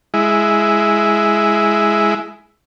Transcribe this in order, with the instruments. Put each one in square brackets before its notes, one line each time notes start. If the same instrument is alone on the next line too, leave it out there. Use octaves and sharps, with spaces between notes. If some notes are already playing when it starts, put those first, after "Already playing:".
[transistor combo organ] G#3 E4